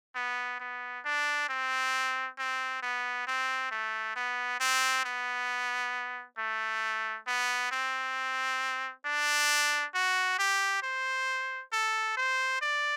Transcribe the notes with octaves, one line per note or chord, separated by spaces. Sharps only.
B3
B3
D4
C4
C4
B3
C4
A3
B3
C4
B3
A3
B3
C4
D4
F#4
G4
C5
A4
C5
D5